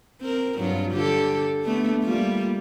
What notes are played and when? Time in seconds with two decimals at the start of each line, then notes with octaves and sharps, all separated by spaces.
0.21 C4 A#4
0.57 G2 F#3 F4
0.92 D3 G4 A4
1.62 A3 B3 D4
2.03 G3 A#3 F4